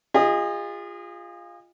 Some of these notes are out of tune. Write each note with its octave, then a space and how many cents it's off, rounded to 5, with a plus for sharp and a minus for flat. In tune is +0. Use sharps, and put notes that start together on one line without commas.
F4 +0 G#4 -35 D#5 +0